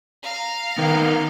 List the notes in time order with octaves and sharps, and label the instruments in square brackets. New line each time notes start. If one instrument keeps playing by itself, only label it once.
[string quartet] F5 A#5
[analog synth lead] D#3 [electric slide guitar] B3 A#4 B4